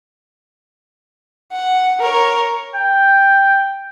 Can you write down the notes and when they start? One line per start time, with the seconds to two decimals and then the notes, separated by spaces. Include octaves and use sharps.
1.53 F#5
2.00 A#4 C#5
2.74 G5